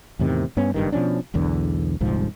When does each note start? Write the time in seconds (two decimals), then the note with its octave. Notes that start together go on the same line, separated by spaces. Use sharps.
0.19 E2 A2 C3 D#3
0.57 G2 B3 C#4
0.74 F#1 G2 D#3
0.92 B2 F3 C#4 D4
1.34 E1 B1 E2 D3
2.01 D#1 C2 G#2 F3